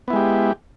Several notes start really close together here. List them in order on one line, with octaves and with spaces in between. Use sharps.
B3 E4 G#3 G4